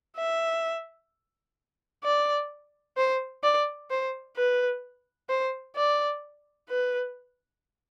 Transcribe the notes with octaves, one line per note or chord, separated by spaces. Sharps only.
E5
D5
C5
D5
C5
B4
C5
D5
B4